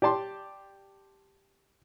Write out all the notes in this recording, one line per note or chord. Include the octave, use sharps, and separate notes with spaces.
G4 D5 A5 C6